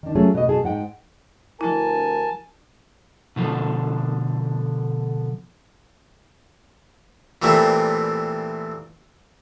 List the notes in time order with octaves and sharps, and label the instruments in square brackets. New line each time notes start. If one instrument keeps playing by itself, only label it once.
[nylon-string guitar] D#3 D4
F#3 A3 C#4 F4 G#4
B2 D#5
B2 G#4 A5
G#2 G#3 F#5 G5
[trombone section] D2 G2 A#4 [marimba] F3 E4 [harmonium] G#5 A5
[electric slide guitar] B2 D3 F3
[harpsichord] A#2 E3 G3 A3 C4